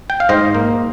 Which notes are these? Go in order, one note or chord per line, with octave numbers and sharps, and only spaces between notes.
G5
F5
G#2 C5 D#5
A#3